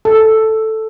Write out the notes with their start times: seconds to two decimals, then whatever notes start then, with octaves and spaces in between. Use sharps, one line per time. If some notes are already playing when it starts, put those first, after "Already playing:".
0.05 A4